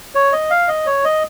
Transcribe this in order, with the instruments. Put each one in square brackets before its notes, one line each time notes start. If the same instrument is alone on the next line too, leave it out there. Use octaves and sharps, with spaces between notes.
[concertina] C#5
D#5
F5
D#5
C#5
D#5